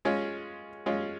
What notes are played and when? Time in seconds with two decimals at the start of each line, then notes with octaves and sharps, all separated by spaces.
0.05 G#3 C#4 F4
0.86 G#3 C#4 F4